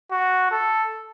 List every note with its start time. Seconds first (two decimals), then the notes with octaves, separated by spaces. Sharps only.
0.12 F#4
0.52 A4